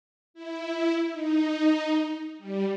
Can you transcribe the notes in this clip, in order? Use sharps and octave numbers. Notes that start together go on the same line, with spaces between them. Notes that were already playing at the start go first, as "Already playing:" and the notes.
E4
D#4
G3